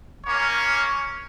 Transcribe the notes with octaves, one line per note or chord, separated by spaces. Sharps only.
A#3 C#4 C#5